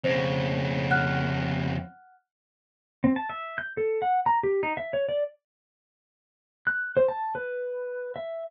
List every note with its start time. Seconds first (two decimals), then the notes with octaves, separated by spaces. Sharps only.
0.04 F2 C#3 C5
0.90 F#5 F6 F#6
3.04 C4
3.16 A5
3.29 E5
3.58 G6
3.77 A4
4.02 F#5
4.26 A#5
4.43 G4
4.63 D#4
4.77 E5
4.93 C#5
5.09 D5
6.67 F#6
6.97 C5
7.08 A5
7.35 B4
8.16 E5